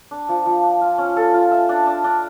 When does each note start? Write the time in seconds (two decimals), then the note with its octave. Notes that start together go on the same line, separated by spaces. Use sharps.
0.11 D4
0.29 F3
0.46 F3
0.63 D4
0.81 F4
0.98 C#4
1.16 A4
1.34 F4
1.51 E5
1.69 D4
1.87 D4
2.04 D4